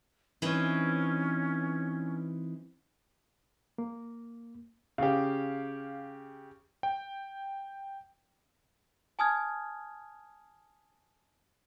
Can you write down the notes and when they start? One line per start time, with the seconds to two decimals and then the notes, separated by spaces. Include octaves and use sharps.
0.42 E3 C4 C#4 D#4
3.78 A#3
4.98 C#3 G4 F5
6.83 G5
9.19 G#5 A5 D#6 F6 G#6